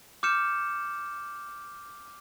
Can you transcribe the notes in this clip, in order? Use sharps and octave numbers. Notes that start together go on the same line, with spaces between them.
D6 F6 G6 C#7 E7